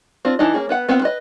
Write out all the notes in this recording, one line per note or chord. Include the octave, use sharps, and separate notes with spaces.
C4 D4 F4
E3 D4 D#4 D#5
A#3 C#4 G#4
B3 B4 F#5
B3 C4 F4 F#5
B4 D#5